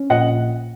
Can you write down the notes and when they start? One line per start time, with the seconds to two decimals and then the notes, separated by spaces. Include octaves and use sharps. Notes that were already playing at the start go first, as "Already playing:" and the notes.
Already playing: C#4
0.10 A#1 D#5 F#5